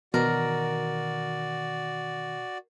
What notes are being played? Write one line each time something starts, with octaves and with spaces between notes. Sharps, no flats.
B2 D#3 E3 F#4 A#4 D5